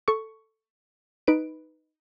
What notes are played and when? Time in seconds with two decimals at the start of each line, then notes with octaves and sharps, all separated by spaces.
0.08 A4 C#6
1.27 D#4 B4 D7